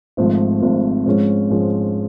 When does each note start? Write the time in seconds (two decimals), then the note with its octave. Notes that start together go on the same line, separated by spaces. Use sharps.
0.17 G#1 G#2 F3 A3
0.62 G#1 G#2 F3 A3
1.06 G#2 F3 G#3 C#4
1.50 G#2 F3 G#3 C#4